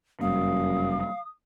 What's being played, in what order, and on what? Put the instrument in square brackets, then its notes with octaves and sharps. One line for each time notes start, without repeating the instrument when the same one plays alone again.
[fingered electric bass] F1 G3 A#3 [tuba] F#2 [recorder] F5 [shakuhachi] D#6